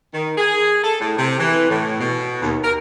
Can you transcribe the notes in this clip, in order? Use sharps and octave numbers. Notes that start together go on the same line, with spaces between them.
D#3
G#4
A4
A2
C3
E3
A2
B2
D#2
A#4